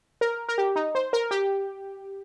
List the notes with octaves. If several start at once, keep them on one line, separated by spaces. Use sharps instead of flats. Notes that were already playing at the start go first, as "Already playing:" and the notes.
A#4
A#4
G4
D#4
C5
A#4
G4